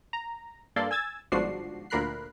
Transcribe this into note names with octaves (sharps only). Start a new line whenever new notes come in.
A#5
G2 A#3 A4 D5 C6
G#5 E6 G#6 A6
G1 G#2 F3 D4 F#4 C7
D2 A#2 A#4 B5 F#6 C7